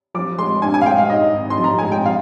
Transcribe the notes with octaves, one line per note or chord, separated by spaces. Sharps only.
F3 D6
G#3 C6
G2 G#5
G#5
F5
G#3 G5
F5
G#2 D#5
G#1
C6
F3
A#5
G#3 G#5
G5
F3 F5